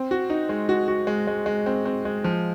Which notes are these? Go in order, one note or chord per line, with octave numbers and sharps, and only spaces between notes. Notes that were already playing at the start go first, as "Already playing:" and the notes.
Already playing: C4
F#4
D#4
G#3
F#4
F#4
G#3
G#3
G#3
C4
C4
G#3
F3